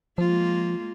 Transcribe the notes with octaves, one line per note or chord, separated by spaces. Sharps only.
F3 G#3 A#3 F4